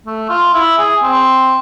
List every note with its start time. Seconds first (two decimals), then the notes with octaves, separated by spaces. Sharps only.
0.06 A3
0.30 F4
0.54 E4
0.78 G#4
1.03 C4